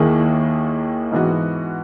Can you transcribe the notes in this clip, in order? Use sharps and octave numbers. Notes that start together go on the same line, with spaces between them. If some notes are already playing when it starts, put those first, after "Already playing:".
Already playing: D#2 D#3 A#3 E4 G#4
G#2 E3 B3 F#4